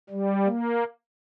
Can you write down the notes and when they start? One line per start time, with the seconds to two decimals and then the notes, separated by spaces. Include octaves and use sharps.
0.10 G3
0.45 A#3